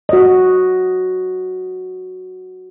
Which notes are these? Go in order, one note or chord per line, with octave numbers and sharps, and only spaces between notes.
F#4 D#5